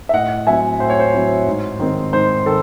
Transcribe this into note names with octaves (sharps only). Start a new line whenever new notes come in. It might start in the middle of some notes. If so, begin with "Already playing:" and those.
E5
A2 D#5 F#5
F#3 C4 E4 E5 G#5
A2 C5
C#5
C5
F#3 C4 E4
G#2
D#3 G#3 C4
G#2 C5
D#3 A4